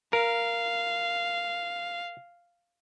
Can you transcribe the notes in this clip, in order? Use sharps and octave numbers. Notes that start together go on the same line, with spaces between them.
A#4 F5